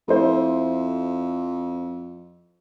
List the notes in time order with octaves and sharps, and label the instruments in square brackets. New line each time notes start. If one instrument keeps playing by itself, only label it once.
[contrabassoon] F2 [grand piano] A3 E4 C5